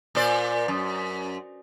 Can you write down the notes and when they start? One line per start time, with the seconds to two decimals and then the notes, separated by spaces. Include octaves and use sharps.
0.15 A#2 C5 D5
0.68 F#2